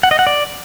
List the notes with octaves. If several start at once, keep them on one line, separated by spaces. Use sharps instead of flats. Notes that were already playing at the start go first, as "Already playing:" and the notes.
F#5
D#5
F#5
D5